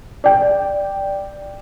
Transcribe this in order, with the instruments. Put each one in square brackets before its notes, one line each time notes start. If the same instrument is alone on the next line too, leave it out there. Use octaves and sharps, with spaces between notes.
[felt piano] D5 G5